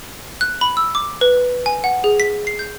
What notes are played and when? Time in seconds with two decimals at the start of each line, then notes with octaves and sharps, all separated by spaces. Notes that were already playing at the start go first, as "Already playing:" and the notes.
0.41 F#6
0.61 B5
0.77 E6
0.95 D6
1.21 B4
1.66 G#5
1.84 F#5
2.04 G#4
2.20 B6
2.47 C7
2.59 G6